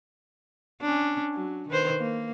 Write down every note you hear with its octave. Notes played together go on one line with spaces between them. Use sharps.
C#4 D4
F#3
D#3 B4 C5
A#3